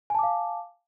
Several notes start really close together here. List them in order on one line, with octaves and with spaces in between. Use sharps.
G#5 A5 D6 F5